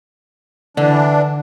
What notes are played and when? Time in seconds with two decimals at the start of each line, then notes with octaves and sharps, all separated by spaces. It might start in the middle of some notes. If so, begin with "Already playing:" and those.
0.77 D3 E3 D4